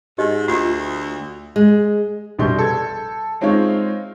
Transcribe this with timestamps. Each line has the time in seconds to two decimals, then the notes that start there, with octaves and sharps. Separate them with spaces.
0.18 G#2 G4 D#5
0.48 D2 F4
1.56 G#3
2.39 A#1 B2 G3 C6 G6
2.58 A4 G#6
3.41 G#3 C4 D#4 F4 C#5